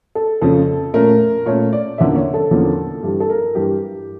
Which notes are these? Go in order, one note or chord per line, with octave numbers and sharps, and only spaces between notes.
A4
F2 C#3 F3 C#4 A4
A#2 A3 C#4 A#4
A#2 A3 C#4 C#5
D5
E2 D3 F3 A#3 C#4 E5
C#5
A4
E2 D3 F3 A#3 C#4
G2 E3 G3
A4
A#4
G2 E3 G3 G4